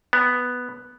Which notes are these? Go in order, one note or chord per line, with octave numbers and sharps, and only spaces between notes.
B3